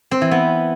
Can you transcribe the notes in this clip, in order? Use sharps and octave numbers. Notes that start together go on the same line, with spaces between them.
C4
E3
B3